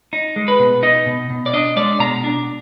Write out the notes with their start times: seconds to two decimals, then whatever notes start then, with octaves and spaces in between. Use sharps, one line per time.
0.13 D#4
0.36 G#3
0.48 B4
0.59 B2
0.83 D#4 D#5
1.06 B2
1.30 B2
1.46 D5
1.53 D4 D#5
1.76 G#3 D5
2.00 B2 A#5
2.24 D4